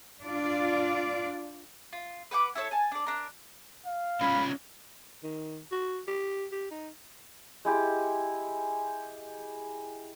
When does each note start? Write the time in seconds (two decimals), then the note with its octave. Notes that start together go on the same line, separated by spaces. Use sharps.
0.23 D4 F4 D5
1.93 F4
2.31 B4 F#5 G5 D6
2.55 E4 A4 C#5 E6
2.71 G#5 A5
2.92 D4 D5
3.07 D4 A#4
3.86 F5
4.21 C#4 D#4 F4 B5
5.24 D#3
5.72 F#4
6.08 G4
6.52 G4
6.71 D#4
7.65 G#3 E4 G4